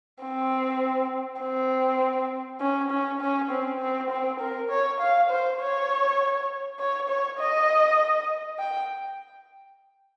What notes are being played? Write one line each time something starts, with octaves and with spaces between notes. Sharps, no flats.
C4
C4
C#4
C#4
C#4
C4
C4
C4
A#4
C#5
F5
C5
C#5
C#5
C#5
D#5
G5